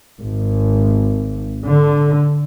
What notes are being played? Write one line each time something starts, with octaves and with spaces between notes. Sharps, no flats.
G#1
D3